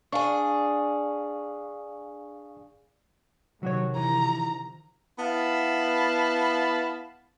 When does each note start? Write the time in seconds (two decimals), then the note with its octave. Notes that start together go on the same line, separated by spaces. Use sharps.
0.12 D4 G#4 F5 C#6
3.63 C3 D#3 F3 F#3 F#4 C#5
3.96 E3 A#5
5.19 B3 E4 F5 A5 B5